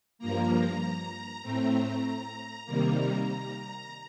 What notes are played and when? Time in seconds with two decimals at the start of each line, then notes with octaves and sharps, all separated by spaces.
0.19 G2 F3 A#3 A#5
1.42 A2 A3 C4 A#5
2.65 C3 D#3 G3 A#3 A#5
2.97 A#5
3.27 A#5